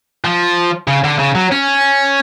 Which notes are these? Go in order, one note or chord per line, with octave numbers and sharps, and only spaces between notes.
F3
C#3
D3
C#3
F#3
C#4